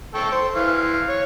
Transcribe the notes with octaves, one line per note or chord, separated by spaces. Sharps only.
A4 G5 C#6
C5
E3 F5
C#5